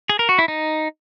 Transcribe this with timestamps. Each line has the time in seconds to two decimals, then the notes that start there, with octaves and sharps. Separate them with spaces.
0.09 G#4
0.19 A#4
0.29 F#4
0.39 E4
0.48 D#4